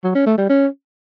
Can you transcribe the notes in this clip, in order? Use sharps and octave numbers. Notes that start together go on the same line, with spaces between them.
F#3
C#4
A3
G3
C#4